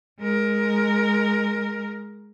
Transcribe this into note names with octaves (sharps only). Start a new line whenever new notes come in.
G#3 A#4